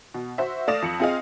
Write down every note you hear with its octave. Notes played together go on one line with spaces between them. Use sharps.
B2
F#4 C5 E5
A3 D5 F5 D#6 A#6 E7
F2 C#7 F#7
C4 F4 G#4 D#5 F5